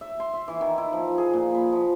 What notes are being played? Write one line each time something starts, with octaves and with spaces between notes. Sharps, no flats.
E5
C6
E5
E3
D#3
E4
F3
G#4
A#2
B5
F3